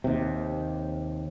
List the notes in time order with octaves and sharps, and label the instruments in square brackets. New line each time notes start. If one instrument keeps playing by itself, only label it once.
[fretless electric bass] D#2 C3